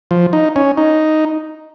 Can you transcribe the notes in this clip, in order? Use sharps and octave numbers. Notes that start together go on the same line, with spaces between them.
F3
D#4
C#4
D#4